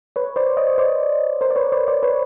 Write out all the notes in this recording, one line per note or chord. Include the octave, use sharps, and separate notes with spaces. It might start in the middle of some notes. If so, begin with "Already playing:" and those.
B4 C#5
C5 D5
C#5 D#5
C5 D5
A#4 C5
D5
B4 C#5
C5 D5
C5 D5
B4 C#5